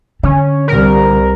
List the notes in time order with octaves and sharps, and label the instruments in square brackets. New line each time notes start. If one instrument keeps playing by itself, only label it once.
[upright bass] D3 [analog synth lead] C#4
[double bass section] C2 [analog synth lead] A#4